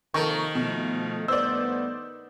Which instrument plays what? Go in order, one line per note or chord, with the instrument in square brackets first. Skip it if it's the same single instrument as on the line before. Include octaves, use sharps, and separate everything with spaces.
[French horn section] C3 F3 A#3 [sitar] D#3 [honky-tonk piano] A4 A#4 C#6
[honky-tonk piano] B2 [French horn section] F3 A3
[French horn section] G2 A3 B3 [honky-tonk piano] C5 D5 [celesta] E6